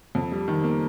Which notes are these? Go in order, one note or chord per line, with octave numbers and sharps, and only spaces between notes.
F2
G3
D#3
A#3